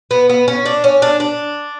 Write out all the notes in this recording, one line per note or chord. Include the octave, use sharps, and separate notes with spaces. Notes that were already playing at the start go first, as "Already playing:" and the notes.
B3
B3
C#4
D4
C#4
D4
D4